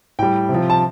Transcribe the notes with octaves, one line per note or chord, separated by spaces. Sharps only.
A2 G3 G5
C3
F3
A5